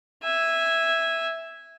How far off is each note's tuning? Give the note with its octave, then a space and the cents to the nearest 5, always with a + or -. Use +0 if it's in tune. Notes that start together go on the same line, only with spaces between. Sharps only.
E5 +0 G#5 -10